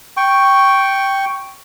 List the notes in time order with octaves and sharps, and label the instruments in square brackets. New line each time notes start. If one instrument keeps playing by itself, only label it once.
[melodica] G5 C#6